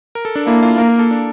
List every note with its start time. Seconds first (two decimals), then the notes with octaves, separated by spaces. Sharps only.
0.15 A#4
0.25 A4
0.35 D4
0.47 A#3 E4
0.63 F4
0.78 A#3 A#4
0.89 A#4
0.99 A4
1.11 D4